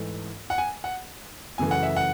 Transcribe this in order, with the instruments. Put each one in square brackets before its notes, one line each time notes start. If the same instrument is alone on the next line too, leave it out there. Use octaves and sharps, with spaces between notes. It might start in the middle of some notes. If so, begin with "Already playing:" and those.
Already playing: [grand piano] G#2 E3 A3
F#5
G#5
F#5
F#2 C#3 E3 A3 G#5
F#5
E5
F#5